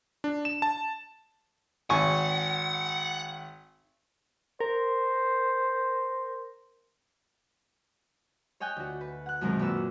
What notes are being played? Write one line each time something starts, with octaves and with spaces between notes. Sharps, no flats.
D4
E7
A5
G#1 F#5 G#5 C#6
A#4 C5
C#5 D#5 G5 G#5 F#6
D2 F#4
B4
F#5 F#6
F#2 B2 D#3 G#3 C4 A#4
A#2 F#4 B4 E6